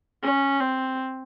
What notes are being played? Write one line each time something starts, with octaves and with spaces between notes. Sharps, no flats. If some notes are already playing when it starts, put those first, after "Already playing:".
C#4
C4